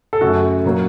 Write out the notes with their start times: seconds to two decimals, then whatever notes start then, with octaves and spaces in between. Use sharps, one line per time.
0.13 A4
0.21 F#2 C#3 A3 F#4
0.64 A#2 F#3 A#3